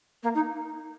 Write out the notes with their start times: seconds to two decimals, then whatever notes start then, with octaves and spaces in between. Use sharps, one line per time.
0.23 A#3
0.34 D#4